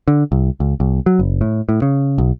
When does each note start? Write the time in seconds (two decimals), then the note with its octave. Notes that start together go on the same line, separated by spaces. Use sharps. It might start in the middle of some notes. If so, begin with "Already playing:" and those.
0.08 D3
0.32 C2
0.60 C#2
0.80 C2
1.06 F#3
1.19 F#1
1.41 A2
1.69 A2
1.82 C#3
2.18 B1